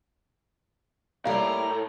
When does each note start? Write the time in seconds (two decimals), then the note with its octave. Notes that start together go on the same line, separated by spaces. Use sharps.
1.25 A2 G3 A#3 G4 A#4 F5 A#5